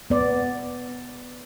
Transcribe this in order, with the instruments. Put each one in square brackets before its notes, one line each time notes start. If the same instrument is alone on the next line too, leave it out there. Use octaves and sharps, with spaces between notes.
[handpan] B3 D5